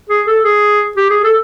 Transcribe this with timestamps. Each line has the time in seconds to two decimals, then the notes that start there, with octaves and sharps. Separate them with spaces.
0.09 G#4
0.27 A4
0.44 G#4
0.97 G4
1.10 G#4
1.24 A4